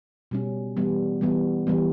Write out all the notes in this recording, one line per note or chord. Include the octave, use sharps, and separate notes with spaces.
B2 G3 C#4
E3 G3 B3
E3 G3 B3
E3 G3 B3